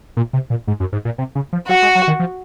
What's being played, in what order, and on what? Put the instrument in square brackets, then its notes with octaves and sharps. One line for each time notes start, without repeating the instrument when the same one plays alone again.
[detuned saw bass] A#2
C3
A#2
G#2
F#2
G#2
A#2
C3
C#3
F3
[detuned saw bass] F#3 [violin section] F#4
[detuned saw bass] G#3
F#3
D#3
F3